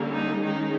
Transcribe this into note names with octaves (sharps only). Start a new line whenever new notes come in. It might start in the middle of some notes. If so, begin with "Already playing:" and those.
Already playing: D3 G3 A#3 C#4
D#4
D#3 G#3 C#4 D#4